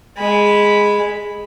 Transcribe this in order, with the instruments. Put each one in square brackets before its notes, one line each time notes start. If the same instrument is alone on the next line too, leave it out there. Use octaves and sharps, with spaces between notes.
[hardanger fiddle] G#3 B5